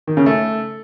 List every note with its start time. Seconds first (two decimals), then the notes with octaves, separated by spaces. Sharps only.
0.07 D#3
0.17 C#3
0.26 A3